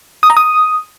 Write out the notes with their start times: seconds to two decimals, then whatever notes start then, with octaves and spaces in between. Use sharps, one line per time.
0.23 D#6
0.30 A#5
0.37 D#6